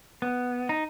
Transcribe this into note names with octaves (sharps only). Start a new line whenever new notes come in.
B3
D#4